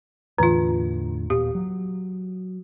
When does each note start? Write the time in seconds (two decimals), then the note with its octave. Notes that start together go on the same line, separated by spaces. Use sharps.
0.38 E2 A2 D3 E3 F4
1.30 D#1 A#2 B3 G4
1.55 F#3